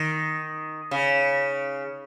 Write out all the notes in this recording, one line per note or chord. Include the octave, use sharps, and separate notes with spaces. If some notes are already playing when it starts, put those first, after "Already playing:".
Already playing: D#3
C#3